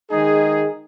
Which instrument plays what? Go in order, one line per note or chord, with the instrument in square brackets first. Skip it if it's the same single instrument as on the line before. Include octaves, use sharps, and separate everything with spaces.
[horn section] D#3 G#3 D#4 G#4